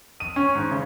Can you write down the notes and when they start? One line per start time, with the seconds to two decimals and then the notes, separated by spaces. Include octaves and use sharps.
0.20 D#7
0.36 C#4
0.55 G#2
0.71 C#3